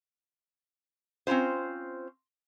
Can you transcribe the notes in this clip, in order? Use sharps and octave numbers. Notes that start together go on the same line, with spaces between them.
C4 C#4 E4 F4 C5